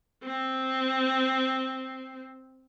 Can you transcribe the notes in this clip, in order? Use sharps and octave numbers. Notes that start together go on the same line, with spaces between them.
C4